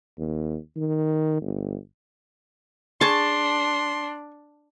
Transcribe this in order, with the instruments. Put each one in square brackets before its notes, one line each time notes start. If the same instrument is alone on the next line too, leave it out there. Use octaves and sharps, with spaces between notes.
[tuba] D#2
D#3
G1
[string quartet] D4 [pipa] G#4 C#6 [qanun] A5 [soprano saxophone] C6